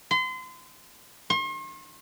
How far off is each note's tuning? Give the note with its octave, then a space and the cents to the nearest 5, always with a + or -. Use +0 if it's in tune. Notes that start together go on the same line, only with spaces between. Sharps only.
C6 -35
C6 +45